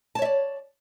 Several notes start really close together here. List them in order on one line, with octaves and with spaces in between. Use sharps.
A5 C#5 E5 D5